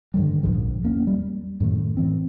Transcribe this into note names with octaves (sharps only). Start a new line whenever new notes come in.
G2 D3 D#3 G3
D#1 A#1 G#2 F3
E2 A#3 C#4
G3
F#2 A2 D#3 A3
A2 E3 C4